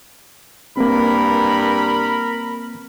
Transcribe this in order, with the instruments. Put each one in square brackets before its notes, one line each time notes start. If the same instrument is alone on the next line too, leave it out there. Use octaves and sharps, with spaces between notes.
[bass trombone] G2 [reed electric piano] A#3 C4 [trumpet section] A#4 B5